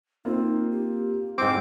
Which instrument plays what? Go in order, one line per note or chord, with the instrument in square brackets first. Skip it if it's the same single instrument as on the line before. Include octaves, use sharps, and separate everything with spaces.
[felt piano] A#3 C4 F4 [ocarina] D#4
[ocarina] G4
[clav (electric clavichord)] G#2 C4 [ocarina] E4 [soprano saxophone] D6